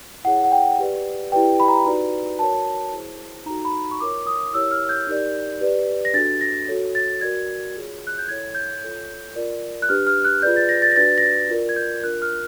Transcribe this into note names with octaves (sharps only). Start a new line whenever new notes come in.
E4 G#4 C#5 F#5
F#5
G5
G4 B4 D5
E4 G4 B4 D5 G5
B5
A#5
D#4 F#4 B4 D5
F#4 A#4 C#5 A5
E4 G#4 C5
D#4 F#4 A4 A#5
B5
C#6
F4 A#4 C#5 D6
D#6
E4 G4 A#4 C#5 E6
F6
G6
D#4 G4 A#4 D5
G4 B4 D5
A#6
D4 F#4 A4 A6
A#6
F#4 A4 C#5
A6
F#4 A#4 D5 G#6
F4 G#4 C#5
F#6
G6
E4 A4 C#5 G#6
G6
F4 A4 C#5
F4 A#4 D5
F#6
D4 G4 B4 F6
F6
F#6
F4 G#4 B4 D5 G6
A6
A#6
A6
A#6
D4 F#4 B4 D5 A6
A#6
A6
F4 A#4 D5
G#6
G6
D4 F4 A#4 F#6
F6